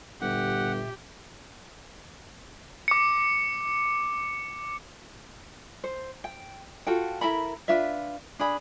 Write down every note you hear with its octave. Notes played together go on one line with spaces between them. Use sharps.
G1 A#2 G4 E5 F#5
D6 C#7
C5
G5
F4 F#4 A4 G5
E4 A4 A#4 B5
D4 F4 B4 E5
D4 G#4 B5